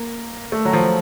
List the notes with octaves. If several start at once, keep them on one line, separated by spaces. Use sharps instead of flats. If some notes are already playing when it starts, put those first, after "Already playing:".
Already playing: A#3
A3
F#3
F3